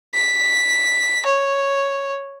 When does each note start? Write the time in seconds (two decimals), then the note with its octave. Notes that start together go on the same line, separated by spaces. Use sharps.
0.14 B6
1.26 C#5